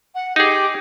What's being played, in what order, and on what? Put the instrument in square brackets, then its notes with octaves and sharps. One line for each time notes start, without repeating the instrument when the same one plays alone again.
[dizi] F#5
[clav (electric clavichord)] D#4 G#4 [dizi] G4